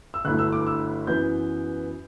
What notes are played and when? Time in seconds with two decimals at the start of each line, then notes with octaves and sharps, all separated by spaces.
0.14 E6
0.25 G1 G2 F#3 A3 E4 F#6
0.39 E6
0.52 D6
0.67 E6
1.07 F#2 E3 B3 E4 G6